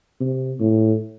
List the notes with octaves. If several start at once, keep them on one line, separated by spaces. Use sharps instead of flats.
C3
A2